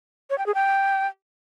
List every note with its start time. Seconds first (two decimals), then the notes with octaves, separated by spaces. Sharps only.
0.30 C#5
0.38 G5
0.46 G#4
0.54 G5